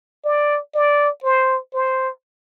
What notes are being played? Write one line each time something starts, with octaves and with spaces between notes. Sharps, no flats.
D5
D5
C5
C5